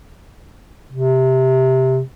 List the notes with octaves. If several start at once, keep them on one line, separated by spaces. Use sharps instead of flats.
C3